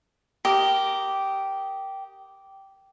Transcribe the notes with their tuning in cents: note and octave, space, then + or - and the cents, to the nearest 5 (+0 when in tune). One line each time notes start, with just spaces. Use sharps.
G4 -10 A#4 -5 D#5 +0